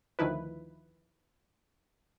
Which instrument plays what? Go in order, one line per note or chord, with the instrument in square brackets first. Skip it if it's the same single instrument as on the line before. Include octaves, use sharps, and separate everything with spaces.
[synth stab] D2 D#3 F3 E4 B4